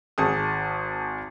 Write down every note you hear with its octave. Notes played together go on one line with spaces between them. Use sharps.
G#1 G#4 A5 D#6